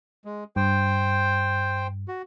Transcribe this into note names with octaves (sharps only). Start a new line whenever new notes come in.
G#3
G2 C5 G5
F#4